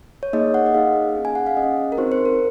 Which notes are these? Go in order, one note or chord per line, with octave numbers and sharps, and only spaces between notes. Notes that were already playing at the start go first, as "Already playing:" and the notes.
C#5
A#3 D#4 G#4 D#5
F#5
D#5
A#3 D#4 G#4 F5
C#4 G#4
G#5
F#5
F5
C#4 G#4 D#5
A#4
C4 D#4 F#4 C5
C5
A#4